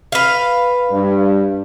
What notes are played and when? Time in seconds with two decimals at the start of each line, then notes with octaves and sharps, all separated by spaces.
0.12 B4 F5
0.89 G2